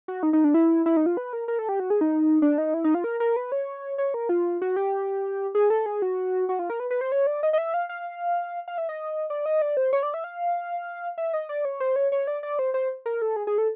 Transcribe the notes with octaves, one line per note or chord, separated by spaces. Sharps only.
F#4
D#4
D#4
D4
E4
E4
D#4
F4
B4
A#4
A#4
A4
G4
F#4
G#4
D#4
D4
D#4
E4
D#4
F4
A#4
A#4
B4
C#5
C#5
A#4
F4
F#4
G4
G#4
A4
G#4
F#4
F#4
F4
A#4
B4
B4
C5
C#5
D5
D#5
D#5
E5
F5
F5
F5
E5
D#5
D5
D#5
D5
C5
C#5
D5
E5
F5
E5
D#5
D5
C#5
C5
C#5
C#5
D5
D5
C5
C5
A#4
A4
G#4
G#4
A4